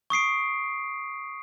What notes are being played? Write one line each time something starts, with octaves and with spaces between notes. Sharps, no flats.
C#6 D#6 C7 D7